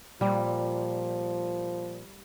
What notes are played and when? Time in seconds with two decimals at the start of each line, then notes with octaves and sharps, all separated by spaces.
0.21 A#2 F3 G3